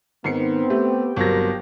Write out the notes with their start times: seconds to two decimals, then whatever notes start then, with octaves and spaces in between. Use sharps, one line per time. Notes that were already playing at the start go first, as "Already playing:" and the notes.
0.24 G#2 D#3 B3 C4 C7 C#7
0.70 A3 G4
1.16 G1 B2 F#3 C4 A#4 A#6